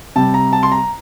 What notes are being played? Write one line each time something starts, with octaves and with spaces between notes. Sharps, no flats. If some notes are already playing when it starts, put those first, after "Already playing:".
C3 G3 A5
A#5
A5
C6
A#5